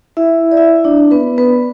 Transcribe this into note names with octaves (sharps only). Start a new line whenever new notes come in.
E4 E5
D5
E4 E5
D4 D5
B3 B4
B3 B4